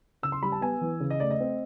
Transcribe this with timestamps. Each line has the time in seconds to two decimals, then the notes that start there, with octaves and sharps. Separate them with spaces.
0.23 C#3 E6
0.32 C6
0.43 G3 B5
0.52 A5
0.61 B3 G#5
0.81 E3
1.00 C#3
1.10 D#5
1.20 A3 D5
1.31 D#5
1.40 C4